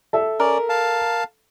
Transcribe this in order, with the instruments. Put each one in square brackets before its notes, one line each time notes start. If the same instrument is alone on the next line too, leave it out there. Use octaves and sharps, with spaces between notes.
[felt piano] A4 E5
[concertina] C#4 D5 [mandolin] A#4
[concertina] F5 A5